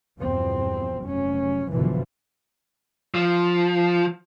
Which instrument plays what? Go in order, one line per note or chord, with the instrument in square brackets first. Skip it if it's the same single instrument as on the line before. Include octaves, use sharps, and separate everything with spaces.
[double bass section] E2 G2 B2 F3 C4
F1 F#3 C#4
F#1 F#2 B2 D3 E3 F3
[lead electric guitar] F3